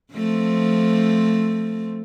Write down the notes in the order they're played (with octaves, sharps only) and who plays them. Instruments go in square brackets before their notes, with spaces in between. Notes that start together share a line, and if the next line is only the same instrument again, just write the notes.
[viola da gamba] F3 A3 C4